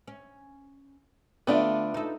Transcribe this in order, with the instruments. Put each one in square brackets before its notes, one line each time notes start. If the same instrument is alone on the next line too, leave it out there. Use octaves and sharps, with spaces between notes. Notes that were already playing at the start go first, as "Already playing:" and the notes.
[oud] C#4
[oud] D3 A3 [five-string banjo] B3 D4 F4
[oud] D#4 A4